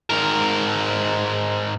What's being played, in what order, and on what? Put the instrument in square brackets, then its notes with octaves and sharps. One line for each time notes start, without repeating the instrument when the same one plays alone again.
[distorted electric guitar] G#2 A#4